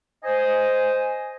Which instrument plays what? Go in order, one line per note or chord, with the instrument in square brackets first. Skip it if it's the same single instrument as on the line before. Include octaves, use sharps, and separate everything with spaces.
[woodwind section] C5 D#5 G#5